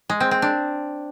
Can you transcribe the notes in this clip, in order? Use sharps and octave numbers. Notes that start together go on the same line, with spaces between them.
G#3
C4
C4
D4